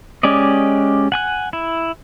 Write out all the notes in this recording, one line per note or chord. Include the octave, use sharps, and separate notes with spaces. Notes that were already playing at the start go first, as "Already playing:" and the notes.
G#3 C#4 G4 D5 D#5
F#5 G#5 F#6
E4